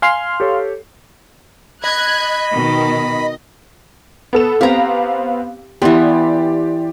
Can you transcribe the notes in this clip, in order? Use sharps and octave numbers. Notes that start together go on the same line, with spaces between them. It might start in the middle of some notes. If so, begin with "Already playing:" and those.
F5 G#5 C6 F6 C7
G4 A4 C#5
D#5 B5 F#6 G#6
B2 D#3
B3 A4 E7
B3 C4 G4 F5 A#5
E3 B3 G4 D5 C6